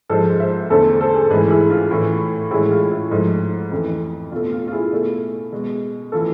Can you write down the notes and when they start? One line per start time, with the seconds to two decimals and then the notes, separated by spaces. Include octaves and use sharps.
0.09 G#2 F3 G#3 A4 C5
0.40 C5 E5
0.70 E2 D3 A3 A4 C5
1.00 A4 C5
1.14 G#4
1.22 A4
1.30 G#2 E3 A3 G#4 B4
1.50 E4 G#4
1.70 F4
1.91 A2 E3 A3
2.51 A2 E3 G#3 E4 G#4
2.71 F4
2.91 E4
3.11 G#2 F3 A3
3.72 F2 E3 A3
4.31 B2 F4
4.36 A3
4.52 F4
4.67 F4
4.72 E4 G#4
4.92 B2 A3
5.52 B2 G#3
6.12 E3 A3 F4 A4